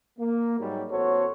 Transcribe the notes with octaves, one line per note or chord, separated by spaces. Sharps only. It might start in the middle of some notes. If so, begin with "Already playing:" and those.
A#3
G#2 F#3 G3
A1 B3 F#4 A4 C5 C#5